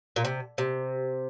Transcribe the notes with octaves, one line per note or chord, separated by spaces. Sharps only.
A#2
C3
C3